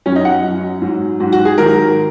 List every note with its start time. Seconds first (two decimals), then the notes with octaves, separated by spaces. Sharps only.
0.06 F#2 F#3 C#4
0.16 D#4
0.25 F#5
0.44 F#2 F#3
0.82 G#2 F#3
1.20 G#2 F#3 F#4
1.32 F#4
1.45 G#4
1.58 G#2 D#3 F#3 A#4